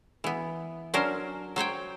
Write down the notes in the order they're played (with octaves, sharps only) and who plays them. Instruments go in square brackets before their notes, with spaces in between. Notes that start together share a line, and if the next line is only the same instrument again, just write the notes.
[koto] E3 B3
F#3 C#4 D4 A#4 C5
F#3 C5 C#5 G5